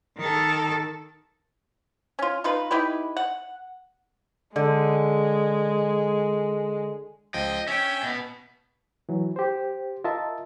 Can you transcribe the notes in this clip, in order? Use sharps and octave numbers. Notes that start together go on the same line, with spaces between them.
D#3 A4
C#4 F4
D#4 F4 B4
D#4 E4 G4 B4
F#5
D3 G#3
C#2 F3 D#5 G5
C#4 E5 G5
B2 B3
E3 F#3
G4 C5
F4 A#4 D#5 E5 A5